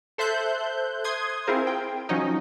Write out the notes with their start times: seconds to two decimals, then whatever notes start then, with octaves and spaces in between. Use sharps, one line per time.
0.18 A4 C5 E5 F#6 G6
1.04 C6 D#6 G#6
1.47 C4 E4 F4 G#4 A#4 C5
1.67 G5
2.09 F3 F#3 C#4 D#4